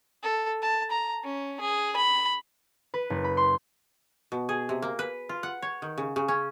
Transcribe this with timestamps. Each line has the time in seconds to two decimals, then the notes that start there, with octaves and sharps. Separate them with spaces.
0.23 A4
0.62 A5
0.91 A#5
1.24 C#4
1.61 G#4
1.96 B5
2.94 B4
3.10 F#1
3.24 B5
3.37 C6
4.32 B2
4.49 G#4
4.69 C3
4.82 A#3
4.99 B4
5.29 F4
5.43 F#5
5.62 C#5
5.82 D#3
5.98 C#3
6.16 C#3
6.28 C#4